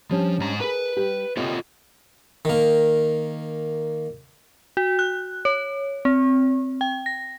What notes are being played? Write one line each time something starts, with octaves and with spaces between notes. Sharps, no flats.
F3 G3 C#4 D4
G#2 A#5
G#4 A#4 B4
G3 G4
C3 F4 A4 C#5 D#5
D#3 A#3
F#4
F#6
C#5
C4
G5
A#6